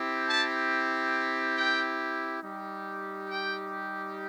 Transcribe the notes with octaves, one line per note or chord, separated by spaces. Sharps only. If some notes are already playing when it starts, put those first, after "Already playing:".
Already playing: C4 E4 G4
A5
G5
G3 D#4 G4
G5